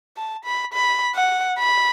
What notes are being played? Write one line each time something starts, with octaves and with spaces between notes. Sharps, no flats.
A5
B5
B5
F#5
B5